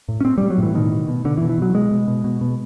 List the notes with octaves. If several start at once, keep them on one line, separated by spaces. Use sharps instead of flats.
A2
C#4
A2 C4
G3
A2
F#3
A2 E3
B2 D#3
B2
B2
B2 D3
E3
B2
E3
B2 F#3
B2 G#3
B2
B2
B2
B2